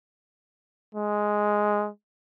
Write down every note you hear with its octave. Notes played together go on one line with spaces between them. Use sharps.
G#3